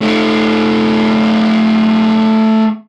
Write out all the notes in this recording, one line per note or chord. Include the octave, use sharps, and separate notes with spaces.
A3 D#4